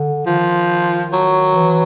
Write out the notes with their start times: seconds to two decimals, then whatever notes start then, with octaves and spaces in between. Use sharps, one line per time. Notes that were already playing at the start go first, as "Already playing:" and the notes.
Already playing: D3
0.26 D#3 F3
1.13 F#3
1.55 E3